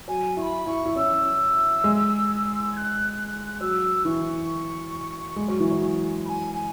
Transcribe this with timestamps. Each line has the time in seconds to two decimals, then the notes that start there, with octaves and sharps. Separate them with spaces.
0.08 F#3 G#5
0.37 E4 C#6
0.42 B5
0.66 E4 C#6
0.86 E4
0.96 C#4 E6
1.84 G#3
2.72 G#6
2.76 F#6
3.60 F#3 E6
4.04 E3 C#6
5.36 G#3
5.48 F#3
5.60 E3
5.71 F#3
6.25 B5
6.28 G#5
6.54 G#5